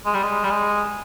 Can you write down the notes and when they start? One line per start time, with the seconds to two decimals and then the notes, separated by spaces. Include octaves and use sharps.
0.05 G#3
0.14 G3
0.23 G#3
0.44 G3
0.50 G#3